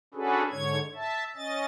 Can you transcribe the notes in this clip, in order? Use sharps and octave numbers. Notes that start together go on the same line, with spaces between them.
C#4 D4 F#4 G#4 A4 B4
G#2 D3 C#5 G#6
E5 A5
C#4 D#5 A6